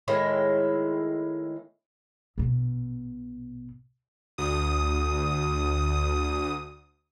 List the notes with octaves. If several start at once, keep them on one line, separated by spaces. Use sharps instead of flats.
A2 D#3 G#3 E4
A#1 B2
D2 D#6